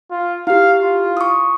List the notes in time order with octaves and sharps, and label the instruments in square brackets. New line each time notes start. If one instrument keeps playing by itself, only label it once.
[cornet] F4
[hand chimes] E4 G4 [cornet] F5
[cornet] F4
[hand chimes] C#6 D#6